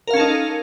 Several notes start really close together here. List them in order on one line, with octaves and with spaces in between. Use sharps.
A#4 F5 C#4 A4 D#4